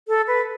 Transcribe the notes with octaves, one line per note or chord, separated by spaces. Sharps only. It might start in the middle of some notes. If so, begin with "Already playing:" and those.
A4
B4